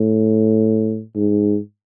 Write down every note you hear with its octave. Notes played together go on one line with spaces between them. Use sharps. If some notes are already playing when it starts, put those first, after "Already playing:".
Already playing: A2
G#2